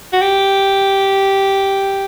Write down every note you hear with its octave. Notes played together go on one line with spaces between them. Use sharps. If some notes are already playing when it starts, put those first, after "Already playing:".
F#4
G4